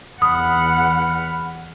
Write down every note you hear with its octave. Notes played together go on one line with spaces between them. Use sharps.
E2 F#5 B5 D#6 F6